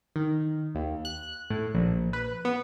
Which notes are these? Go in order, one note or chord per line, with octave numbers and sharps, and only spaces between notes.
D#3
D#2
F#6
A2
A#1
B4
B3